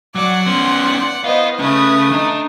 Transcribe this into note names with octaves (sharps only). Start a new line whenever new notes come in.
F#3 D5 F#5 D6
B3 C#4 C6
B3 E4 C5 D#5 F5
C#3 A3 C#4 B4 D#6
D4 D#4